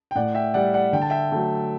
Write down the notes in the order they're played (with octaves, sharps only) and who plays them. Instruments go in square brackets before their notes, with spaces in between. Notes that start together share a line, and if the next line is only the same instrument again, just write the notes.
[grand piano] G5
A2 D5 F#5
E5 G5
G3 D5 F#5
D5 F#5
D3 G5
A5
E5 G5
F#3 A3